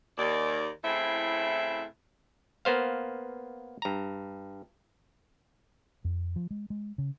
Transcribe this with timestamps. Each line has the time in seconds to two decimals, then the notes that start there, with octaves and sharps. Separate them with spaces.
0.18 D#2 D5
0.83 A2 C#3 C4 E4 E5
2.65 A#3 B3 C5 F5
3.82 G2 A#5
6.05 F2
6.36 F3
6.51 G#3
6.70 G#3
6.98 C#3